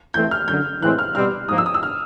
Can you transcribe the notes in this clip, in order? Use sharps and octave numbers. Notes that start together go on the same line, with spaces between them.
E3 A3 C4 G6
F6
F#2 D3 F#3 G6
A2 E3 G#3 C4 F#6
F6
B2 G3 C4 F6
G#2 F3 A#3 D#6
E6
D#6
E6
F6